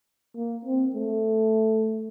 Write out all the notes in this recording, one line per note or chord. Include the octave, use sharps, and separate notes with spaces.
A#3
C4
A3